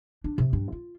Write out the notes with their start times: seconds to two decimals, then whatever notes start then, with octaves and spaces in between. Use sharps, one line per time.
0.24 D4
0.38 C3
0.53 G2
0.72 F4